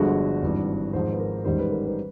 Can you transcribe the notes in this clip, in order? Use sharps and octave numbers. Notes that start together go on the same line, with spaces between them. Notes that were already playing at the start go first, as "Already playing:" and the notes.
Already playing: G1 G2 D3 F3 G#3 F#4
G#1 G2 E3
G#1 G#2 F3 C5
B4
A#4
A1 G#2 D#3 G3 C5
B4
A#4
B4